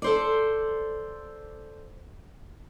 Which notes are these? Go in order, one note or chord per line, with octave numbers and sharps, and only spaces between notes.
A4 C5 D5